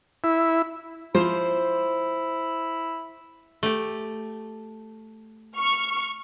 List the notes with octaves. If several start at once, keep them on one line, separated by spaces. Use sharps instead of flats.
E4
F3 E4 C5
A3 G4
C#6 F6